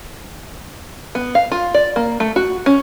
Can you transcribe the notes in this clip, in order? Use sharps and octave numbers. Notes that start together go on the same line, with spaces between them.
B3
F5
F4
D5
A#3
A3
F#4
C#4